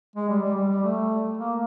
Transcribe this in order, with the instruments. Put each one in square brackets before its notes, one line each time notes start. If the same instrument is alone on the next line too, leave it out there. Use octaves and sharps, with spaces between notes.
[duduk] G#3
G3
G3
G3
G3
A3
A#3